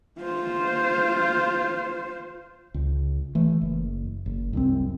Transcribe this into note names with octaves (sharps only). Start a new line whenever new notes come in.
F4 C5
C#2
E3 A3
F#1
F#1
C2 F#2 C4